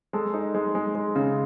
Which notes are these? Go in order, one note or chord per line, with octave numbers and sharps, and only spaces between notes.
G#3 A4
D#4
G#3
G#3
G#3
C#3